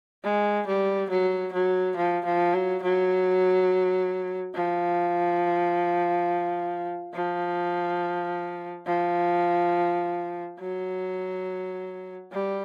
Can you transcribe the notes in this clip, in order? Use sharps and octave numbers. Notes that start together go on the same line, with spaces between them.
G#3
G3
F#3
F#3
F3
F3
F#3
F#3
F3
F3
F3
F#3
G3